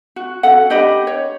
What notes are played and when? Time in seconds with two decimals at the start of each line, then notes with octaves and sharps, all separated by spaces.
0.16 F#4
0.43 C#4 A4 F#5
0.70 D4 G4 D#5 B5
1.07 C#5